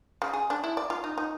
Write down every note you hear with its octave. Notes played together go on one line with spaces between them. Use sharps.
C#3
G#4
D4
E4
D5
F4
D#4
D#4